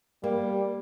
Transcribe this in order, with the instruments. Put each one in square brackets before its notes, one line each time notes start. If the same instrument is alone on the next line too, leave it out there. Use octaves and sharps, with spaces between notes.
[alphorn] G3 [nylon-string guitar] A#3